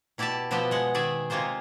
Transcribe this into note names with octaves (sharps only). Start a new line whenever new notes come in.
B2 E4 G4 D5 E5 A5
B2 F3 B3 G4 D#5 E5
G#3 F#5
D#3 G#4 D5 E5 G#5
C3 G#3 A#3 F4 C5